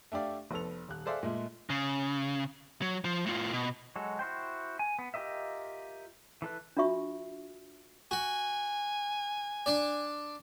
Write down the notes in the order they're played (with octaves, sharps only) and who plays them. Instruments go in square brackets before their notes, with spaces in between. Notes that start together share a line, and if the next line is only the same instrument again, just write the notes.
[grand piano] A3 D4 G4 D5 F5
F1 B3 A4 F7
D#1 F#6
G#4 A4 C5 D5 E5 F5
A#2 G#3 A3
[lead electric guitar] C#3
F#3
F3
A2 F4
B2
[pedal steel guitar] F#3 G#3 F#4 A4
E4 F#4 C5 G5
G#5
B3
F4 G4 A#4 D#5 E5
E3 A4 B4
[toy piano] D4 F4 F#4 E5 C#6
[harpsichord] F#4 [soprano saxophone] G#5
[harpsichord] D4 D5